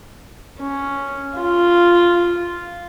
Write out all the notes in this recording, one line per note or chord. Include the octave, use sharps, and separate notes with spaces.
C#4
F4